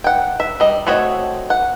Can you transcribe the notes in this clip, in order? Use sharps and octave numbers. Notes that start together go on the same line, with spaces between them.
F#5 G5
E5
G3 D#5
A3 C4 F#4 C#5 D#5
F#5